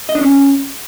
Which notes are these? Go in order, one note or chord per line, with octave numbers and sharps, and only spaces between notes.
D#5
D4
C#4